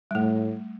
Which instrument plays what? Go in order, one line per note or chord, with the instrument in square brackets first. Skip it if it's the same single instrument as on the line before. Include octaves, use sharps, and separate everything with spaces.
[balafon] G3
[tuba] A2 [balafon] A3